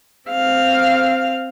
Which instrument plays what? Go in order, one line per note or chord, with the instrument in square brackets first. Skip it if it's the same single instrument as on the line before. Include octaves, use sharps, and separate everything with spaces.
[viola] C4 F5